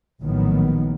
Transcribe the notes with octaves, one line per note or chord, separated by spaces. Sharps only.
A#1 A2 D#3 F#3 B3